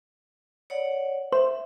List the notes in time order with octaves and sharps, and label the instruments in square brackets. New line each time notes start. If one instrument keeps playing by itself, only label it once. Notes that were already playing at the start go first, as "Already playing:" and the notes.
[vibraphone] C#5 D5 F#5
[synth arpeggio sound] C5 [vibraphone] E5